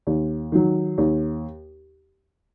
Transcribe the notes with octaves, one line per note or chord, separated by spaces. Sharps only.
D#2
D#3 F#3
D#2